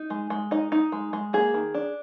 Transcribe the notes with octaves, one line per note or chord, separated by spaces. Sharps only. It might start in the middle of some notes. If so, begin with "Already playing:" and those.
Already playing: D#4
G#3
G#3
D#4 D#5
D#4
G#3
G#3
A#3 G#4
D#3
D4